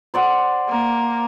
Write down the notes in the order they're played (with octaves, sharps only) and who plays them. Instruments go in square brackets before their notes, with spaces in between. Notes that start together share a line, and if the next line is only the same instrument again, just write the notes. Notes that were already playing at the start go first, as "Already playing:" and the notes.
[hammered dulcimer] C5 D5 F#5
[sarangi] A#3